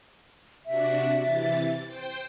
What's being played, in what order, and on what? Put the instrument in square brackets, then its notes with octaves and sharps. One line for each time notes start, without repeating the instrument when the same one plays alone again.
[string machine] C3 D4 F#4 [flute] E5
[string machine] C3 E3 A6
C5 G5